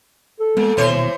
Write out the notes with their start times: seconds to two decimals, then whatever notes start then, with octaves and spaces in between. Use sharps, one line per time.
0.40 A4
0.57 A#2 G#3 A#3 B3
0.77 D#1 B2 E3 C5 C#5